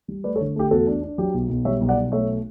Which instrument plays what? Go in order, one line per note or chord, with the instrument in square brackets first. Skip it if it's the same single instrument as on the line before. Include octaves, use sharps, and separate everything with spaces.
[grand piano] G3
A3 B4 D5
A4 C#5
D3
A3 G4
E2 F#4 A4
D4
D4
F#3 G4
B1
B1
G3 C#5 E5
B1
D5 F#5
B1
A3 C#5 E5